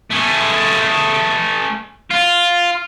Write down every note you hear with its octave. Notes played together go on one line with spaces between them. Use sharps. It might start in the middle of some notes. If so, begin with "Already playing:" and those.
A3 G#4
F4